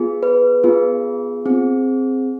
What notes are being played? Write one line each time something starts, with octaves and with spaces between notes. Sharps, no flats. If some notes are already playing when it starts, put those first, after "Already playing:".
Already playing: B3 F4 G#4
B4
B3 F4 G#4
C4 G#4